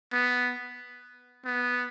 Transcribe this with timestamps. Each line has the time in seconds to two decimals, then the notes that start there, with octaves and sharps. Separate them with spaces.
0.13 B3
1.45 B3